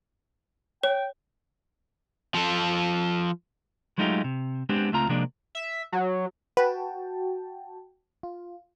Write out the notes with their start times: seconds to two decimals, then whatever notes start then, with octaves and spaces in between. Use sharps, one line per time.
0.83 C#5 G5
2.34 F3 A4
3.98 F#3 G#3 A3 D#4 F4 G4
4.24 C3
4.69 G#3 B3 C4 D4 G4
4.92 C#2 A3 C4 F4 A#5
5.09 C3 F3 G#3 A#3 D4
5.55 E5
5.92 F#3
6.57 F#4 B4 G5 A5
8.23 F4